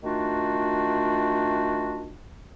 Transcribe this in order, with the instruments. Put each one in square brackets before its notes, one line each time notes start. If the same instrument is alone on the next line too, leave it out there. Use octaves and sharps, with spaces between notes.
[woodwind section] D#3 A3 D4 F4 F#4